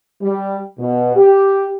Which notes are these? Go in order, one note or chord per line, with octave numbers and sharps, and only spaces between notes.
G3
B2
G4